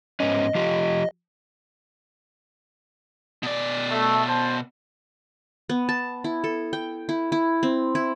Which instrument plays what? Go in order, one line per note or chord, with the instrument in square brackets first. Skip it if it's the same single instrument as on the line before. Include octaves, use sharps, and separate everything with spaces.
[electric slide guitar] G#2 B3 C#4 [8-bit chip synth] D#5
[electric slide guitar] F3 F4 G4
[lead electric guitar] B2 D5
[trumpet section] A3
C5 A5
[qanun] B3
A5
E4
A4
G5
E4
E4
C4
E4